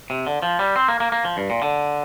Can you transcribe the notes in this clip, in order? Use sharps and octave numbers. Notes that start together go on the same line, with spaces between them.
C3
D3
F3
G3
C4
A#3
A#3
A#3
F3
G2
A#2
D3